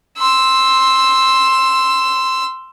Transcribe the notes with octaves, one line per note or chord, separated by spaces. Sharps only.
C6 E6